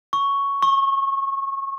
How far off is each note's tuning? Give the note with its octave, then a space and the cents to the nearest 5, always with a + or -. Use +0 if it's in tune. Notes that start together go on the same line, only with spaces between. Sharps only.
C#6 +5
C#6 -25